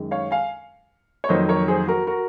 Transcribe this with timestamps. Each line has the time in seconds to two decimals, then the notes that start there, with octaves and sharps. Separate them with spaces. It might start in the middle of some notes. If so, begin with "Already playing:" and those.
Already playing: F#2 D#3 G#3
0.11 C#5 F5
0.31 F5 G#5
1.24 C#5
1.29 F2 D#3 F#3 A#3 C5 D#5
1.48 A#4 C#5
1.68 G#4 C5
1.87 F#4 A#4
2.07 F#4 A#4